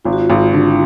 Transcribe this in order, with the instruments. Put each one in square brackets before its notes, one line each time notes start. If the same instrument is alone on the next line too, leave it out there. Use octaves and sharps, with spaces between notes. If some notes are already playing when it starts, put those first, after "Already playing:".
[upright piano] G#1 [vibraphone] F4
[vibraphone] F#4
F4
[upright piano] G#1
[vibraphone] F4
[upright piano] D3
[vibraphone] E4